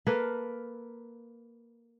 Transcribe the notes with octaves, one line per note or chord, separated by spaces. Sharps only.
A#3 A4 B4 F5